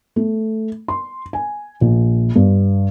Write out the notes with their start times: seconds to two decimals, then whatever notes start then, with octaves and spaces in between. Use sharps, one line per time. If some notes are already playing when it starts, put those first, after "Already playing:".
0.16 A3
0.88 C6
1.33 G#5
1.81 A#1
2.36 G2